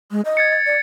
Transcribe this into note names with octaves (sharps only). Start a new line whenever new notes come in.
G#3
D#5
G#6 A6 C#7
A6
D5